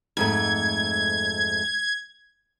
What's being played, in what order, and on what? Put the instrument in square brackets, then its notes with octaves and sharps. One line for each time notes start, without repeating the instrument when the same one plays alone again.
[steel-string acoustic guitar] F2 G#2 A3 [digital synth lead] G#6